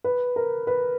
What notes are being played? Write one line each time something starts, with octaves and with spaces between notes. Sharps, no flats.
B4
A#4
B4